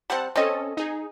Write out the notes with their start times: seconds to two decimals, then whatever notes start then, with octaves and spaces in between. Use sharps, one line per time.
0.10 G3 C4 F#5 A5
0.36 C4 C#4 A4 D#5
0.77 D#4 G#4